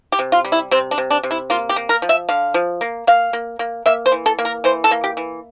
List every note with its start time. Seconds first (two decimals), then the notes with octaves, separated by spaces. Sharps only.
0.12 G4
0.19 C3
0.32 F4
0.45 G3
0.52 E4
0.71 C3 C4
0.91 D4
0.98 C3
1.11 D4
1.23 C3
1.31 E4
1.50 A#3 F4
1.69 G4
1.76 A#3
1.89 A#4
2.02 F3
2.09 E5
2.29 D3 F5
2.54 F3
2.81 A#3
3.07 A#3 F5
3.33 A#3
3.59 A#3
3.86 A#3 E5
4.06 C5
4.12 E3
4.26 A4
4.39 A#3
4.45 A#4
4.64 E3 C5
4.84 A4
4.91 A#3
5.04 G4
5.17 E3